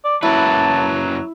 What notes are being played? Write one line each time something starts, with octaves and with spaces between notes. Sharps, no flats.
D5
F#2 F#3 A#3 E4 B4 A5